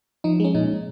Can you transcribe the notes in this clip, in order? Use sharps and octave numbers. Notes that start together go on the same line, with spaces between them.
F3 D#4
G#3 C#4
A#2 D#4